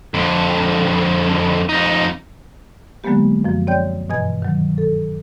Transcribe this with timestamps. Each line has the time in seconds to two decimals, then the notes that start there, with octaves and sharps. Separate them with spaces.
0.14 F2 D3
1.69 F2 D#4
3.04 D3 F#3 G#3 A#3 B3 G4
3.45 F#2 F3
3.67 C4 C#5 D5 G5 G6
4.10 G2 B2 E3 D#5 G#5 G#6
4.42 D#3 F#3
4.78 A4